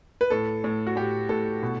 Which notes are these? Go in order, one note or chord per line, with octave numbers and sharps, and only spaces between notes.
B4
A2 A4
A2
F#4
A2 G4
A2 A4
B2